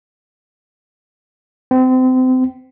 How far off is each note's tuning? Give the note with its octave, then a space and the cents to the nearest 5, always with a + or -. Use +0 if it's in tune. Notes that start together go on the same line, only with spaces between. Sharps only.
C4 -30